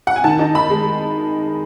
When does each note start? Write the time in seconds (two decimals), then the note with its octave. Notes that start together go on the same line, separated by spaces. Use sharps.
0.07 F#5
0.16 G#5
0.24 D#3 A5
0.39 D#4
0.55 D#3 B5
0.70 G#3